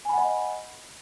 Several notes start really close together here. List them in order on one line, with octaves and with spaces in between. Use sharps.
G#5 B5 F#5 D#5